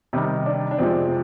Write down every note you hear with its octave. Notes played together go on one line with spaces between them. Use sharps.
C3 D#3 G3 D#4
D4
D4
F2 C3 F3 G#3 C4